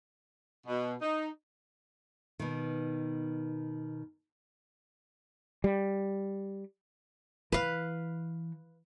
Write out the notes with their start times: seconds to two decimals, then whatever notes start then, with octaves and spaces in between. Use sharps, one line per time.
0.67 B2
1.02 D#4
2.39 B2 D#3
5.64 G3
7.52 E3 B4 F5